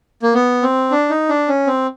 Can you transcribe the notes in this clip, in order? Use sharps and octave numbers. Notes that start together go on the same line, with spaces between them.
A#3
B3
C4
D4
D#4
D4
C#4
C4